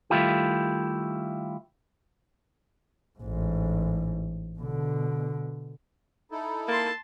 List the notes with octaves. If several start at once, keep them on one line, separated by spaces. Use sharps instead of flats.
D#3 G3 A3 E4 F4 G4
A1 G#2
B2 D3
D#4 E4 A4
A#3 A5 C6